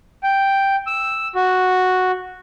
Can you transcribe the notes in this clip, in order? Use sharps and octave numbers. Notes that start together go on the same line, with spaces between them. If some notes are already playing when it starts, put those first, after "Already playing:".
G5
E6
F#4